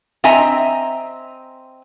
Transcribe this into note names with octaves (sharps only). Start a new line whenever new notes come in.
C4 D#5 E5 G#5 A#5